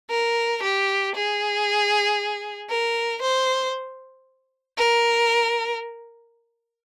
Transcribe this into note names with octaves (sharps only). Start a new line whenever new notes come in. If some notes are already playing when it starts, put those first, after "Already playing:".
A#4
G4
G#4
A#4
C5
A#4